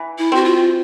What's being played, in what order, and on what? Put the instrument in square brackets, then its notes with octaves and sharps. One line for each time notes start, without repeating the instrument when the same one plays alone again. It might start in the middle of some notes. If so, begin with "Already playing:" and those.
Already playing: [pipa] E3
[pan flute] E4
[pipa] C4 [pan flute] F#4
[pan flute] F4